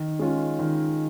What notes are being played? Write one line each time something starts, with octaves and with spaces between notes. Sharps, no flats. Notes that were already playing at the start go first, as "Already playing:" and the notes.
Already playing: D#3
G#3 C#4 F4
D#3